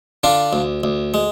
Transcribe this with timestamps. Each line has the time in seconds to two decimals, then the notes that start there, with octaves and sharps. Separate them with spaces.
0.24 D3 D4 F4
0.53 D2
0.84 D2
1.14 G#3